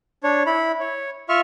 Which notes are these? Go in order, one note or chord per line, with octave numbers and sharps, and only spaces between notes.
D4 C#5
E4 B5
C#5
F4 E5 C#6 F6